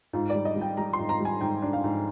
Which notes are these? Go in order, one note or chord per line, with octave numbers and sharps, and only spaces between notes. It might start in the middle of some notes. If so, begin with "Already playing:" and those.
G#2 F4
D5
G3
D#5
G3
G5
G3 A#5
C6
G#2
A#5
G3
G#5
G#2 G5
D4
F5
G#2